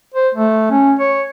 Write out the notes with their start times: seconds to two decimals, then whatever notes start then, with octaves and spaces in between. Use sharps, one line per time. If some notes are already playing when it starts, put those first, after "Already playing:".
0.14 C5
0.35 A3
0.71 C#4
0.99 C#5